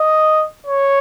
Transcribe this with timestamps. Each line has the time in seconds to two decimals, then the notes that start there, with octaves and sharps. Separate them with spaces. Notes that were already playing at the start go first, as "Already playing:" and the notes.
Already playing: D#5
0.67 C#5